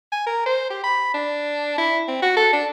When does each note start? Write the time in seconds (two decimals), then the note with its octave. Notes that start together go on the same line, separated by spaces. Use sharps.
0.12 G#5
0.26 A#4
0.46 C5
0.70 G4
0.84 B5
1.14 D4
1.78 E4
2.08 C4
2.22 F#4
2.37 A4
2.53 D4